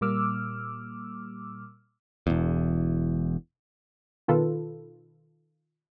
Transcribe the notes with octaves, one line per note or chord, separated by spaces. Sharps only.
A#2 G3 A#3 D6 E6 F6
E1 E2
B2 D#3 F4 A4 B4